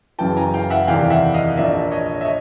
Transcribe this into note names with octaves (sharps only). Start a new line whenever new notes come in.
F#1 F#2 C#3 E3 G5 A5
G#5 A#5
F5 G5
E5 F#5
E2 C3 D#3 G3 F5 G5
E5 F#5
D#5 F5
A#1 A#2 F3 D5 E5
C#5 D#5
E5
C#5 D#5